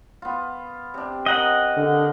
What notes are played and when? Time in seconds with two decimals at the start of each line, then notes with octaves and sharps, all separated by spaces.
0.22 B3 F4
0.94 C3 D4
1.26 A#4 C#5 D#5 F#5 G5
1.76 D3